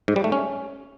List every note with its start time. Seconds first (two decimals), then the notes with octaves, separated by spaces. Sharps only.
0.08 G#2
0.16 G3
0.24 A3
0.32 C#4